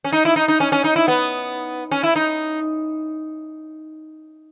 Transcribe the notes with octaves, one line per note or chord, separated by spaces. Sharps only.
C#4
D#4
E4
D#4
D#4
C#4
C#4
D#4
E4
B3
C#4
E4
D#4